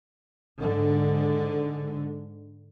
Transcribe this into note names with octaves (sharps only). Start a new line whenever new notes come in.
G#2 D3